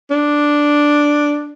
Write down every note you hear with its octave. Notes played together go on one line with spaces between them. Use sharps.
D4